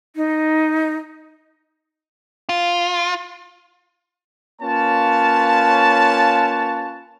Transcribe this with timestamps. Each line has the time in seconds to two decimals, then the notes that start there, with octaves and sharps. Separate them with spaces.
0.16 D#4
2.49 F4
4.62 A#3 C#4 F4 B4 C#5 A5